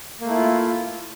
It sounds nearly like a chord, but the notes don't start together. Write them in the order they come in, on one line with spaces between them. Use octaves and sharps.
A#3 A3 E4 F4